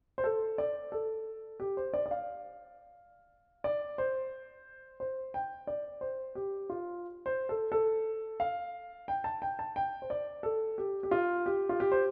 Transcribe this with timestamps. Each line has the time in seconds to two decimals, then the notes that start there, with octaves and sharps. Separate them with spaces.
0.18 C5
0.24 A4
0.58 D5
0.92 A4
1.60 G4
1.77 C5
1.94 D5
2.06 D5
2.11 F5
3.64 D5
3.98 C5
5.00 C5
5.34 G5
5.67 D5
6.01 C5
6.35 G4
6.70 F4
7.26 C5
7.49 A4
7.72 A4
8.40 F5
9.08 G5
9.24 A5
9.42 G5
9.59 A5
9.76 G5
10.02 C5
10.10 D5
10.43 A4
10.78 G4
11.03 G4
11.11 F4
11.46 G4
11.69 F4
11.80 G4
11.92 C5